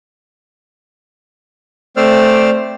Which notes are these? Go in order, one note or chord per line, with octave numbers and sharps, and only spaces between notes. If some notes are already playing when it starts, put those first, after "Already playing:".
A3 C4 C5 D5 E6 F6